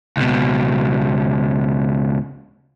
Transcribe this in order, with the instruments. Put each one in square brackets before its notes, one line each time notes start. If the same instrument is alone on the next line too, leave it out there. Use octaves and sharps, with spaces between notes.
[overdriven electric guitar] C#2 B2